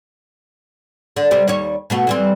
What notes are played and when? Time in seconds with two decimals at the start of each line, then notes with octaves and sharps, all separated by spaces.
1.16 D3
1.31 C3 G3 C4
1.48 D#2 G3 C#5
1.90 B2 A3 B3
2.07 E3 G3 C4